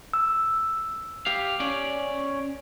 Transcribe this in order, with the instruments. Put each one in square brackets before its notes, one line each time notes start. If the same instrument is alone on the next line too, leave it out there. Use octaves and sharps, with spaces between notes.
[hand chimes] E6
[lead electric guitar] G4 F5
C#4 D5